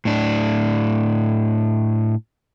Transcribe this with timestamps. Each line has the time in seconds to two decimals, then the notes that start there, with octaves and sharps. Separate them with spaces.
0.05 A2 D4